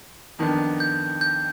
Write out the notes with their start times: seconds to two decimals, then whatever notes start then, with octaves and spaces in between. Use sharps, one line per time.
0.39 F2 D#3 B3 D4
0.80 G6
1.21 G6